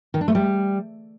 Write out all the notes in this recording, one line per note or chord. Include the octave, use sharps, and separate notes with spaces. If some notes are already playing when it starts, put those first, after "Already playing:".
D#3
D4
A3
G3